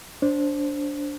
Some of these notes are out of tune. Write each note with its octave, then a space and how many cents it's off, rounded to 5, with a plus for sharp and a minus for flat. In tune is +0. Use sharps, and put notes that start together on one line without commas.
D4 -15 C5 +10